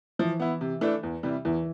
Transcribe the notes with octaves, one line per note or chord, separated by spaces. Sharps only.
E3 F3
B3 E4
C3
E3 A3 D4 A4
E2
C3 E3 G3
E2 E3